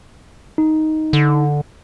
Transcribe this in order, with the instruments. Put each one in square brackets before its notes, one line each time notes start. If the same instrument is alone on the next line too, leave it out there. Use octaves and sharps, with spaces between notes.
[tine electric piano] D#4
[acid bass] D3